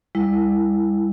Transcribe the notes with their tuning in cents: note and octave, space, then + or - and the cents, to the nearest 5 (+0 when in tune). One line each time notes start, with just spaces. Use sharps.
G3 +40 E4 +0